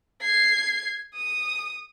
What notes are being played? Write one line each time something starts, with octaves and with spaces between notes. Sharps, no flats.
G#6 C7
D#6